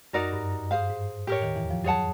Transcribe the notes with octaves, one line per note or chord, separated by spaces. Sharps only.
F#2 D#4 F#4 A#4 D5
G2
F#2
G2 G#4 C5 F5
G#2
A2 G4 A#4 C#5
D#2 D#3
E2 E3
F2 F3
F#2 F#3 G#4 C#5 F#5 A5